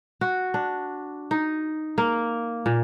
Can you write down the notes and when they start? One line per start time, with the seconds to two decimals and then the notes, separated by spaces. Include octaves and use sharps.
0.21 F#4
0.54 D4
1.31 D#4
1.98 A#3
2.66 A#2